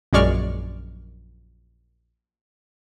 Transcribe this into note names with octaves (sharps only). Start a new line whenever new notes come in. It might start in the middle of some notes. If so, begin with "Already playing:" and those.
A#1 F#2 G#3 D5 C#6 F6